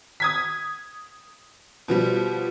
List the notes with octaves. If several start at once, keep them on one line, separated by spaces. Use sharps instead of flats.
D#6 G#6 B6
B2 F3 G3